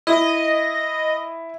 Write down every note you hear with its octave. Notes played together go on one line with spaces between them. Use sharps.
E4 D#5